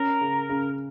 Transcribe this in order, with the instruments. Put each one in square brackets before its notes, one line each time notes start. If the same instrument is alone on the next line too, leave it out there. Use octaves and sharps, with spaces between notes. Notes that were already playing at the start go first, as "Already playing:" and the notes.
Already playing: [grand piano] C#4 [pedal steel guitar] A#4
[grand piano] C#3
C#3